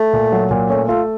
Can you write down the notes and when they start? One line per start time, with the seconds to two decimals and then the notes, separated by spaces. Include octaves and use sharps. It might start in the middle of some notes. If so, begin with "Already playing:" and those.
Already playing: A3
0.13 A#2
0.32 F#3
0.51 A#2
0.69 A3 C#4
0.89 A3 F4